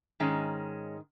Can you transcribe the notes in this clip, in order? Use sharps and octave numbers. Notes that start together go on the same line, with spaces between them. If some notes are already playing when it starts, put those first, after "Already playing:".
G#2 D#3 G#3 C#4